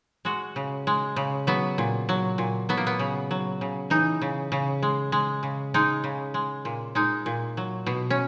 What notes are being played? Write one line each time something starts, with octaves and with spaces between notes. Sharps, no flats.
G#3 F#4
C#3
G#3
C#3
F#3 B3
A#2
F#3
A#2
F#3 B3
A#3
B3
C#3
F#3
C#3
E3 D#4
C#3
C#3
G#3
G#3
C#3
G#3 D#4
C#3
G#3
A#2
G#3 D#4
A#2
F#3
B2
C#4